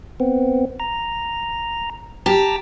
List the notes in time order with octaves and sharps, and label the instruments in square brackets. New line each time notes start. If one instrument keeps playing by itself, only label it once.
[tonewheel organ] B3 C4
A#5
[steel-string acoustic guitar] G4 [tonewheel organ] A5 A#5